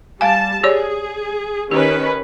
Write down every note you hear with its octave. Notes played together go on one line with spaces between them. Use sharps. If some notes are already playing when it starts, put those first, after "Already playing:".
G3 F5 G#5 A5
G4 G#4 C#5 D5
D#3 C#4 G4 B4